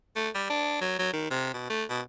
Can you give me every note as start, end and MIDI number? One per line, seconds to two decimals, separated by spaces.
0.16 0.29 57
0.35 0.49 55
0.50 0.80 62
0.81 0.97 54
0.99 1.13 54
1.13 1.30 51
1.31 1.52 48
1.54 1.66 47
1.70 1.84 57
1.90 2.01 47